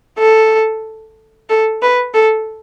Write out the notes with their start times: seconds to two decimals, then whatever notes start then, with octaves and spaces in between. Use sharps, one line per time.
0.19 A4
1.49 A4
1.82 B4
2.14 A4